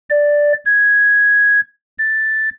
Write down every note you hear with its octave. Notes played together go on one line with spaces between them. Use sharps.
D5
G#6
A6